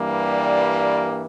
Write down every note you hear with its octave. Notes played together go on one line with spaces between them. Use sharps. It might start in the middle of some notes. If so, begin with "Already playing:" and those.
Already playing: G2 E3 G3 A#3
D5
D5